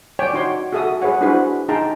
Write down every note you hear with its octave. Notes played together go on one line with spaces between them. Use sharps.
C#5 D5 G5 G#5
D#4 F#4 C#5 C6
F#4 G#4 A4 E5 D#6
G#4 B4 C#5 F#5
D4 E4 F#4 G#4 B4 C5
D#4 G#4 G5 A5 A#5 C6